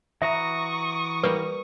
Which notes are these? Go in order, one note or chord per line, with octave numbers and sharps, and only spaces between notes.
E3 F#4 E5 A#5 C#6 D#6
G3 A#3 B4